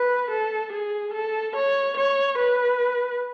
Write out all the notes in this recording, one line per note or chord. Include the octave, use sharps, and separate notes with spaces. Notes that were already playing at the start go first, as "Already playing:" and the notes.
Already playing: B4
A4
G#4
A4
C#5
C#5
B4